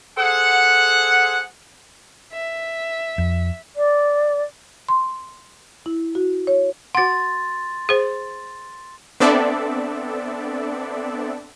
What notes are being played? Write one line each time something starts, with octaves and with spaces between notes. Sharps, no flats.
G#4 A4 C5 F#5
E5
F2
D5
C6
E4
F#4
C#5
F#4 F#5 C6 A6
G#4 C5
B3 C4 D4 A4 D5 E5